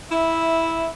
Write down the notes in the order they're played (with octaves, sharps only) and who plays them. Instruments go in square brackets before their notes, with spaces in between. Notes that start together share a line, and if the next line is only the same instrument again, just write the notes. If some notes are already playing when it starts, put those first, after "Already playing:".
[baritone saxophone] E4 [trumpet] E5